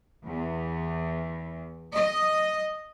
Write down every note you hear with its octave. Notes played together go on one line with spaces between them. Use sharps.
E2
D#5